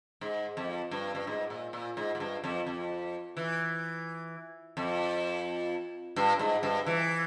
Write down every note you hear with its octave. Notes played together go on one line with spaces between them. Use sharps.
G#2
F2
G2
G2
G#2
A#2
A#2
G#2
G#2
G2
F2
F2
E3
F2
G2
G#2
G2
E3